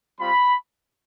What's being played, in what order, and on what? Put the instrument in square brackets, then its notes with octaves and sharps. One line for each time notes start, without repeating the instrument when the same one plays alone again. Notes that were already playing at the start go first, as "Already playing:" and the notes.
[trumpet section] G3 C4 F4 B5